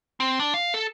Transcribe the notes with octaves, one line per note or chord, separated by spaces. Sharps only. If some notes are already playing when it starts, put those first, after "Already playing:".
C4
D4
F5
A4